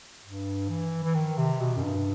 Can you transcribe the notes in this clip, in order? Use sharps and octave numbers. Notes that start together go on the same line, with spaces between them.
G2
E3
E3
D#3
C3
B2
F#2
G2